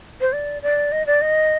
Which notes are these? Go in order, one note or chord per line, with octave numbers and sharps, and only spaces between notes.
C5
D5
D5
D#5
D5
D#5